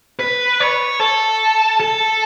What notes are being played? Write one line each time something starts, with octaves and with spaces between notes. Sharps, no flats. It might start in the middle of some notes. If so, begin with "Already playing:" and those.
B4
C#5
A4
A4